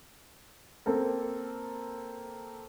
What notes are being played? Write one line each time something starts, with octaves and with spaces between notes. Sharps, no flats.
A#3 C4 A4 A#4